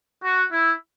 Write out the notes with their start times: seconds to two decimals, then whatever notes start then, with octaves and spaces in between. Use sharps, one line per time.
0.23 F#4
0.52 E4